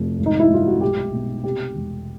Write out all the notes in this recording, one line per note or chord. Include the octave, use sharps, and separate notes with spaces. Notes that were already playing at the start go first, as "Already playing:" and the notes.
Already playing: F1
G#1
D#4
E4
G2 F4
F#4
B1 G4
B2
C3 G4
E1